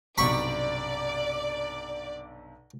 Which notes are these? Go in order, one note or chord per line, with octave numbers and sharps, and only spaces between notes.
B1 G2 C3 D5 B5 C#6